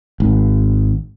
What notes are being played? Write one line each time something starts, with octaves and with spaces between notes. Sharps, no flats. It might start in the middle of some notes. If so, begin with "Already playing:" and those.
G#1